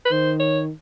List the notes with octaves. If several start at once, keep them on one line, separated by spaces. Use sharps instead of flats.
B4
D#3 C5
C#5